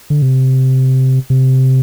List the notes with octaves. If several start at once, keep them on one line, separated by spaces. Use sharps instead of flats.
D3
C3
C3